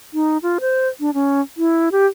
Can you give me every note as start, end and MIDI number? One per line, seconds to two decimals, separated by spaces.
0.14 0.38 63
0.43 0.58 65
0.61 0.88 72
1.00 1.13 62
1.14 1.41 61
1.57 1.89 64
1.92 2.06 67